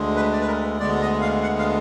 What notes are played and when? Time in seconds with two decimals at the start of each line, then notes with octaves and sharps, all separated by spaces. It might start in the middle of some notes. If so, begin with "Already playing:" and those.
Already playing: D2 D3 G#3
0.16 B4
0.32 D5
0.41 B4
0.47 A#4
0.80 D2 D3 G#3 B3 D5
1.01 D#5
1.21 F5
1.43 F#5
1.59 F5